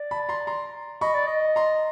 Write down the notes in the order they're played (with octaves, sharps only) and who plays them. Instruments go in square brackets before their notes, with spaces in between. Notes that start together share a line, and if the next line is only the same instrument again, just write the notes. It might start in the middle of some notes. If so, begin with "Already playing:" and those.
Already playing: [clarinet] D5
[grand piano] A5 B5
A#5 C6
A#5 C6
[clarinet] D#5 [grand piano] B5 C#6
[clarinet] D5
D#5
[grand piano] A#5 C6